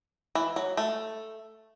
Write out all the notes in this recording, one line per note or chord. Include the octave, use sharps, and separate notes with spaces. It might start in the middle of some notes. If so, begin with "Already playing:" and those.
E3
F#3
A3